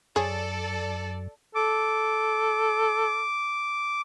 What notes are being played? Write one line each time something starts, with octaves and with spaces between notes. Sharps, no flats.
F#2 G#4 A4 C#5 D5
A4 D6